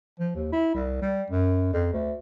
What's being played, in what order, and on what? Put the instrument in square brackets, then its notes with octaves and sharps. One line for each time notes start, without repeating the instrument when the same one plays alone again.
[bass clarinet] F3
D#2
E4
C2
G3
F#2
F2
D2